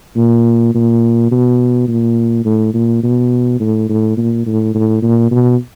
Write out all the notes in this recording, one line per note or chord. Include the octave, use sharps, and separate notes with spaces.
A#2
A#2
B2
A#2
A2
A#2
B2
A2
A2
A#2
A2
A2
A#2
B2